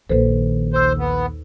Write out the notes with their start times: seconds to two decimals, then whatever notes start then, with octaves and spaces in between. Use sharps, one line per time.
0.09 A#1 D#3 A4 B4 C5
0.73 D#2 C5 E6
0.99 B3